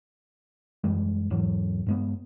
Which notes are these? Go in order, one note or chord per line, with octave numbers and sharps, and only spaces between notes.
F#2 E3 G3 G#3
E2 G#2 E3 F#3
G2 G#3 B3